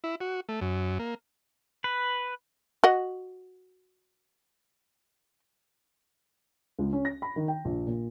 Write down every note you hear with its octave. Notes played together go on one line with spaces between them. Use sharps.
E4
F#4
A3
F#2
A#3
B4
F#4 D#5 F#5
C#2
C#4
A#6
B5
D#3
G5
A#1
A#2